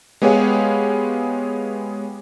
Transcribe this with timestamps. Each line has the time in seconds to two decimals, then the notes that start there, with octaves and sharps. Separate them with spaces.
0.22 G#3 B3 G4 G#4 C#5 F5